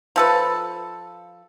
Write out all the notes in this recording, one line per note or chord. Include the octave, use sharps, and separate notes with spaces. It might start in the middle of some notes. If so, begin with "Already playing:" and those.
F3 A4 B4